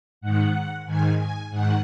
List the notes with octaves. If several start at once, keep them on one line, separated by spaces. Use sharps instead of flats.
G#2 D#3 F#5
G#2 D#3 G#5
G#5
G#2 D#3 F#5